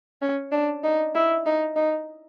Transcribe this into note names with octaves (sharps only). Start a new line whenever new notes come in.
C#4
D4
D#4
E4
D#4
D#4